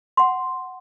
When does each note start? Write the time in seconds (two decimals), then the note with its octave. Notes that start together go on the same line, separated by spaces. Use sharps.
0.17 F#5 C6